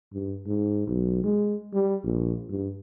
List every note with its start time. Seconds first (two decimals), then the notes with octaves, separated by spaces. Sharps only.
0.13 G2
0.47 G#2
0.87 B1
1.24 G#3
1.74 G3
2.04 A#1
2.49 G2